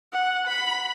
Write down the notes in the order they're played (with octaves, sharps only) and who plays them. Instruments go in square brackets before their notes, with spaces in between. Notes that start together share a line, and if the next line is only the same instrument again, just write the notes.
[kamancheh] F#5
B5